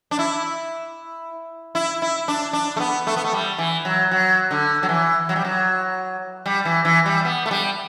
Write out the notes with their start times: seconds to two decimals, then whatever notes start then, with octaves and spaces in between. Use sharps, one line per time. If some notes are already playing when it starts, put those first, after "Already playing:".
0.11 D4
0.19 E4
1.75 E4
2.02 E4
2.28 D4
2.53 D4
2.76 A3
2.80 B3
3.07 A3
3.17 B3
3.24 A3
3.33 G3
3.58 E3
3.85 F#3
4.11 F#3
4.51 D3
4.83 F#3
4.89 E3
5.29 F#3
5.36 G3
5.45 F#3
6.46 G3
6.65 E3
6.85 E3
7.06 G3
7.25 B3
7.46 A3
7.51 G3